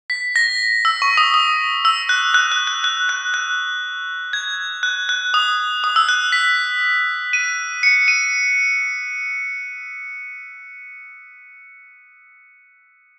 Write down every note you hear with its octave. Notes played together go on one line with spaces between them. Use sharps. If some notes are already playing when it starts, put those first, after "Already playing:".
B6
A#6
E6
C#6
D#6
D#6
E6
F#6
F#6
F#6
F#6
F#6
F#6
F#6
G#6
F#6
F#6
D#6
D#6
E6
F#6
B6
D#7
C#7
D#7